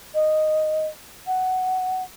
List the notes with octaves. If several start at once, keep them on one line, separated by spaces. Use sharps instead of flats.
D#5
F#5